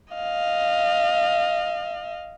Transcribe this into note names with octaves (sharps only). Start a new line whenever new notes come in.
D#5 F5